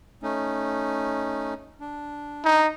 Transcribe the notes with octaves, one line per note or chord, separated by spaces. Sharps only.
A3 C#4 D#4
D4
D#4